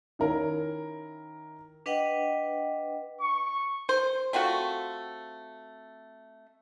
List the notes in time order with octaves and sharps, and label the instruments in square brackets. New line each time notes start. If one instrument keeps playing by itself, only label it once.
[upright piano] D#3 C#4 E4 A#4
[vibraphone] D4 B4 D#5 F#5 G5
[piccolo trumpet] C#6
[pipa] C5
A3 C4 F4 F#4